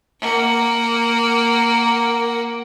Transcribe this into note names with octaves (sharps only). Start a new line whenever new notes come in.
A#3 F#5